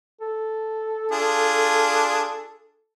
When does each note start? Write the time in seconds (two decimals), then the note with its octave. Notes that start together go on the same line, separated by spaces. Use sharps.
0.21 A4
1.12 D4 F4 G#4